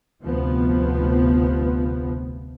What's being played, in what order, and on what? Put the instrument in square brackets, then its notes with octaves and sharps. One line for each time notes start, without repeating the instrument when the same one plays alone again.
[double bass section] F1 D2 C3 F3 B3